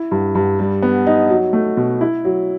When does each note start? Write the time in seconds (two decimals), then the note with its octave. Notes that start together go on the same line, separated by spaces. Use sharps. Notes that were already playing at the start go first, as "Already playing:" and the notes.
Already playing: E4
0.11 G2
0.35 G2
0.59 G3
0.82 B3
1.07 D#4
1.30 F#3
1.53 A3
1.77 B2
2.01 E4
2.25 F#3